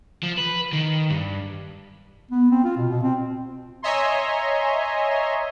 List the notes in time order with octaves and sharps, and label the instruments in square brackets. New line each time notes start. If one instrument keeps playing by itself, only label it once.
[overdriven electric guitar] F3
B4
D#3
G2
[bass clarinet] B3
C4
F4
B2
B2
C4
[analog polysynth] C#5 D#5 E5 G#5 A#5 C6